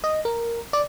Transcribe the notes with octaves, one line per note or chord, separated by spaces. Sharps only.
D#5
A#4
D5